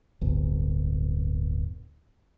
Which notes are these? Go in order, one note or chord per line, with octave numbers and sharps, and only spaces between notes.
D1 G1